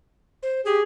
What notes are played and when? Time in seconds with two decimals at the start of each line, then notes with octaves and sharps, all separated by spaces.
0.43 C5
0.65 G4 G#4